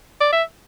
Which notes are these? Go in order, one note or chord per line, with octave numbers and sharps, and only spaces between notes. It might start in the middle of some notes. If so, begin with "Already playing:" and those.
D5
E5